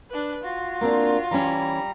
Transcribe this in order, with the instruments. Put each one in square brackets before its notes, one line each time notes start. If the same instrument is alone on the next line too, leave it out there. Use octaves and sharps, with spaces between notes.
[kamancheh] D4 B4
[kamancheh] F4 [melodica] F#4
[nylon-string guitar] A#3 C4 D4
[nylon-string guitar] E3 C#4 [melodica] G3 A#5